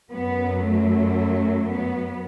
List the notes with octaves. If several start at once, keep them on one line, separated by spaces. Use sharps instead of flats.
F#2 F#3 B3
A3
B3